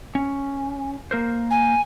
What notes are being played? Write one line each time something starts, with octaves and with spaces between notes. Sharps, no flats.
C#4
A#3 A#4 C5
G#5